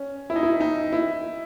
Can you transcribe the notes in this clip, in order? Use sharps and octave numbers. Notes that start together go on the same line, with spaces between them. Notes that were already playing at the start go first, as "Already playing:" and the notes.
Already playing: C#4
E4
D#4
E4
D#4
E4